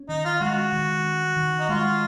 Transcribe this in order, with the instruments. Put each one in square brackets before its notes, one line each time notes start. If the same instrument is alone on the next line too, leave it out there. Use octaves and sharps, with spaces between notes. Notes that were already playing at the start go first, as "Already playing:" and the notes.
Already playing: [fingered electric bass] C#4
[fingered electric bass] D#3 [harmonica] D#4
[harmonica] F4
[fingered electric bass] G#3 [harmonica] F#4
[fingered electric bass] D#3
C#4
D#3
[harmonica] D#4
[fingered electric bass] G#3 [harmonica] F4